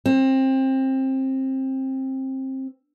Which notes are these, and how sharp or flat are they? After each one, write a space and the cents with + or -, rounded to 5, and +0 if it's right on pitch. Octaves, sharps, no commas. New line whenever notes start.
C4 +20